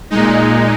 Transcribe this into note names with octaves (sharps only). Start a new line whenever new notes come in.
A#2 G#3 D#4